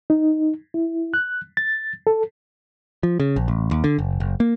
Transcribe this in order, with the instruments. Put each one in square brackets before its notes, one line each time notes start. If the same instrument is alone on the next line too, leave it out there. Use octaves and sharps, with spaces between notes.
[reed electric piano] D#4
E4
F#6
A6
A4
[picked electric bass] F3
C#3
A#1
A1
D#2
D3
F#1
F#1
A#3